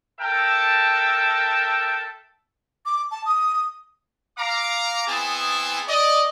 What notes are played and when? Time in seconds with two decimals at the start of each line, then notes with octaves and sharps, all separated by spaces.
0.20 A4 A#4 E5 G5 A5
2.86 D6
3.11 A5
3.25 D#6
4.38 F5 A#5 D6
5.07 B3 C4 E4 G#4 G#5 A5
5.87 D5 D#5